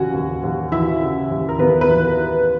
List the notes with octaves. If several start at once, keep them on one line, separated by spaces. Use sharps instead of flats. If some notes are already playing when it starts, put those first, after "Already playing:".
Already playing: D#2 C#3 E3 F#4 F#5 G#5
D#2
D#2
E3 E4 E5
C#3
D#2
A#4
D#2 B3 B4
B3 B4
E3